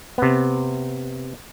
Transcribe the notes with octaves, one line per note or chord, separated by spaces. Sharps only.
C3 B3